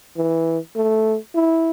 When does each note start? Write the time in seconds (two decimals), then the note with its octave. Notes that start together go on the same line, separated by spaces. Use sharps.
0.17 E3
0.76 A3
1.35 E4